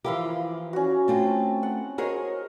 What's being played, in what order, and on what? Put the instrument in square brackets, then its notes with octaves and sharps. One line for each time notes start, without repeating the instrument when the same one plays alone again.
[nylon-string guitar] E3 F3 G4 [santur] A#3 E4 F5
[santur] C#4 F#4
[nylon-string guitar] A3 C4 F4 [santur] G5 A5
[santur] F#5
[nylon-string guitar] F#4 G#4 C#5 [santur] A#4 C5 D#5